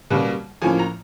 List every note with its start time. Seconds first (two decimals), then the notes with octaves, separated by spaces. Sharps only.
0.10 B2 G3 A#3 C#4
0.62 A2 F3 A#3 C#4 G#5
0.79 A#5